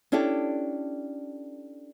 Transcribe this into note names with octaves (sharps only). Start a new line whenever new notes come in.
C#4 D4 E4 G4 A4